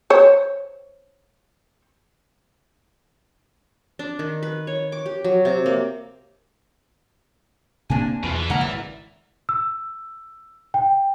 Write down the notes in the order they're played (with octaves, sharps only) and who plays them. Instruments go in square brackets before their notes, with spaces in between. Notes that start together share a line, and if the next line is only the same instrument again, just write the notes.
[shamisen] C5 C#5
[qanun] D4
D#3
B4
C#5
D6
G4
F#3
C3
A#3
[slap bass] C3 A#3 C4 [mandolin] D4 G#5
[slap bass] E2 [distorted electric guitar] B2 F4
[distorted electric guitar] E3
[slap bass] C#3 G#3 A#3 [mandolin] F#5 A#5 F6
[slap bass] G#1 [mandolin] D5
[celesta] E6
G5